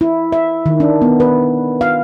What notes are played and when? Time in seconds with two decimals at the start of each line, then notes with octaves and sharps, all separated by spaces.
0.01 E4
0.32 E5
0.66 D#3
0.80 D4
1.02 B3
1.20 B4
1.81 F5